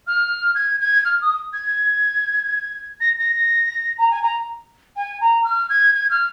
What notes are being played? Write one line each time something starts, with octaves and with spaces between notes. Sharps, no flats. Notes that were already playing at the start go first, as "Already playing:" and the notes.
F6
G#6
G#6
F6
D#6
G#6
A#6
A#6
A#5
G#5
A#5
G#5
A#5
F6
G#6
G#6
F6